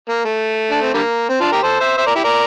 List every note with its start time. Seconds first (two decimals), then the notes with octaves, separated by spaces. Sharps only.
0.09 A#3
0.25 A3
0.71 D4
0.82 C4
0.94 D3 G3 A#3
1.29 C4
1.40 D4 F4
1.52 G4 A#4
1.63 A4 C5
1.80 C5 E5
1.98 C5 E5
2.07 A#4 D5
2.15 E4 G4
2.24 A#4 D5